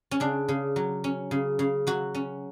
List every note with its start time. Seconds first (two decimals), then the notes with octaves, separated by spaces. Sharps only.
0.11 C#4
0.20 C#3 D4
0.48 C#3
0.76 F#3
1.04 C#4
1.31 C#3
1.59 C#3
1.87 F#3 F#4
2.14 C#4